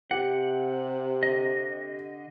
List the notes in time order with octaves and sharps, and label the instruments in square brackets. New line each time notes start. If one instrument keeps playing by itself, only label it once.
[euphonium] C3 [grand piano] G4 [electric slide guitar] F#5
[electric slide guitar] D3 D#5